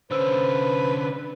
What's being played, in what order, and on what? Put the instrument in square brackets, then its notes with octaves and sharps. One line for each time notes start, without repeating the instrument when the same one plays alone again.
[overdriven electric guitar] D3 C#4 [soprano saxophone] B4 [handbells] C5 E6